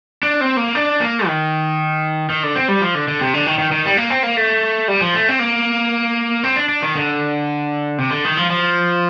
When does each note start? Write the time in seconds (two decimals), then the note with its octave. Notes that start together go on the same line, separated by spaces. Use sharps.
0.23 D4
0.41 C4
0.57 A#3
0.75 D4
1.00 A#3
1.27 D#3
2.30 D#3
2.43 D3
2.55 C4
2.68 G3
2.81 F3
2.95 D3
3.08 D3
3.21 C3
3.34 D3
3.47 D#3
3.58 D#3
3.72 D#3
3.85 G3
3.97 A#3
4.10 C4
4.23 A#3
4.37 A3
4.88 G3
5.01 F3
5.15 A3
5.28 C4
5.39 A#3
6.44 C4
6.56 D4
6.69 D4
6.83 D#3
6.95 D3
7.98 C3
8.11 D3
8.25 D#3
8.37 F3
8.50 F3